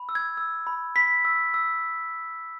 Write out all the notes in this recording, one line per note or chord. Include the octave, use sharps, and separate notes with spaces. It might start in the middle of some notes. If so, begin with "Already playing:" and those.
Already playing: B5
E6
G#6
E6
B5
B5 B6
E6
E6